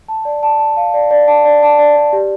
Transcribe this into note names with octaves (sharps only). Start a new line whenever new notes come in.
A5
D5
A5
A5
F5
D5
D5
A5
D5
A5
D5
D5
G4